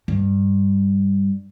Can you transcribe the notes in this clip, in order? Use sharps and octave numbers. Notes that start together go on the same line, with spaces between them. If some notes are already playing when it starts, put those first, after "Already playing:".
G2